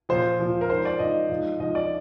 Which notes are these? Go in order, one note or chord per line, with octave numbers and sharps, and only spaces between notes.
A#2 F3 C5
A#2 F3
A#4
G#2 F3 C5
D5
G#2 F3 D#5
G#2 F3
G#2 F3 D#5
D5